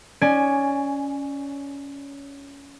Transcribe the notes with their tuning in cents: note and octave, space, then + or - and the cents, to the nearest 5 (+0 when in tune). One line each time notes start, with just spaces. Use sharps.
C#4 +15 D5 +20 G#5 +0